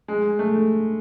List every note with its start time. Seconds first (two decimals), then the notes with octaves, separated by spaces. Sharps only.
0.08 G#3
0.39 A3